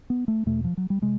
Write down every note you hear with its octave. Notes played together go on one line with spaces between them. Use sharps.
B3
A3
E2 B2 A3
F3
F#3
G3
C3 G#3